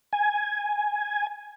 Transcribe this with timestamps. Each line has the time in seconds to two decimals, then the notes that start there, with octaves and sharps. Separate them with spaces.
0.13 G#5